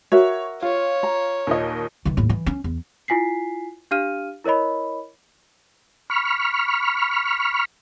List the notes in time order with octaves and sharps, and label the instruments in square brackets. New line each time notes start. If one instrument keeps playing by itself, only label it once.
[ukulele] F#4 A#4 E5 [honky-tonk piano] C#5
[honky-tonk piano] F4 [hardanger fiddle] C#5
[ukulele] A#5
[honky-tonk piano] D#2 A#2 D#5
[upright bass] D#3 E3
D#2 A2
E3
C#4
E2
[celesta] E4 F4 G#5 B6 C7
D4 G4 F5 F6 D#7
E4 A#4 C#5 D#5 B5
[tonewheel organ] B5 C#6 F6